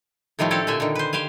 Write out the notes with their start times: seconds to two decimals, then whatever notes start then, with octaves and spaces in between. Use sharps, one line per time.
0.39 A2 D#3 F3 G3 A3
0.51 C4 D4 G4 A4 C#5
0.67 A#2 D3 E5 G#5
0.80 D3 D#3
0.95 B4 C5
1.13 G4 C5 F5 G#5